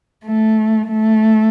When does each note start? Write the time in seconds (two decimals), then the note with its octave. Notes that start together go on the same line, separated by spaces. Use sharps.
0.25 A3
0.88 A3